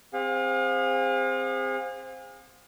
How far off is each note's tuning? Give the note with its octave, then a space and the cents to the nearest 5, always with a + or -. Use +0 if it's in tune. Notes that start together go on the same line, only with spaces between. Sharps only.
C4 +0 G#4 -35 F5 +35